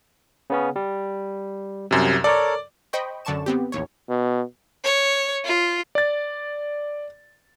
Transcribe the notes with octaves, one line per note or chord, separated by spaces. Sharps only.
C#3 B3 C#4
G3
C2 F#2 C3
A4 A#4 C#5 D5
C5 D#5 G5 B5 C#6
F#2 D3 D5 A5 C#6 E7
B3 C4 G4
A1 D#2 C#5
B2
C#5
F4
D5 A6